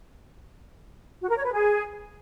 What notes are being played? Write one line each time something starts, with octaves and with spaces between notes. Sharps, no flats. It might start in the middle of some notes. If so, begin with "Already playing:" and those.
F#4
A#4
C#5
B4
G#4